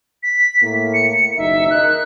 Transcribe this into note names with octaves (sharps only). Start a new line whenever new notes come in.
B6
A2 A3 A#3
C#7
F#1 D#2 D#4 E5
D#4 A#4 F#6